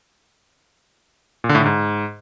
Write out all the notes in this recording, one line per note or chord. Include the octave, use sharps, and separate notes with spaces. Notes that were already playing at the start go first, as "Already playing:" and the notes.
A#2
D3
A2
D3
G#2